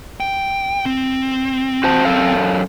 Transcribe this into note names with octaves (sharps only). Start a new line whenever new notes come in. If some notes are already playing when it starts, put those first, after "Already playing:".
G5
C4
F#4 C5 A5
F#2 A4 F5